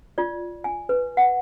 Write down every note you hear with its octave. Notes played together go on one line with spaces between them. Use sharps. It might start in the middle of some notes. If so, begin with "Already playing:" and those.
F4 D5
G#5
B4
F#5